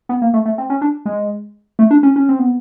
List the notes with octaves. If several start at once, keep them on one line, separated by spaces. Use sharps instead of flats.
B3
A#3
A3
A3
C4
C#4
D4
G#3
A3
D4
C#4
C#4
C4
B3